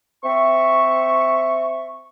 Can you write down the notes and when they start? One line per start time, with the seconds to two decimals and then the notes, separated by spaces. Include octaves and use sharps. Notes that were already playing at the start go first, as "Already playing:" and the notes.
0.24 C4 E5 C#6